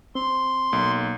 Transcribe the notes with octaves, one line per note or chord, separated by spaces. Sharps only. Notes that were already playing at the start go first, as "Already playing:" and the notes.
C4 C6
B1 A#3